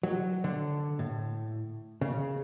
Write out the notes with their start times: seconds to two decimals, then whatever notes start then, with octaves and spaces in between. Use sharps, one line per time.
0.03 F#3
0.44 D3
0.99 A2
2.01 C#3